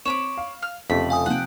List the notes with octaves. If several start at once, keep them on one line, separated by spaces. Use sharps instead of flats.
C4 C#5 B5 D6 E7
F5
F6
F1 F2 C#3 A3 G4 B5
F5 G#5 D#6
C3 F3 F#5 G5